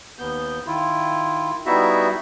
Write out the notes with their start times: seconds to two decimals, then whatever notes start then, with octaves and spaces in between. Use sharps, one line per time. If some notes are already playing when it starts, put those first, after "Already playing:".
0.19 D#2 B3 G6
0.67 D#3 E4 F4
1.66 G3 B3 D#4 E4 F#4 E5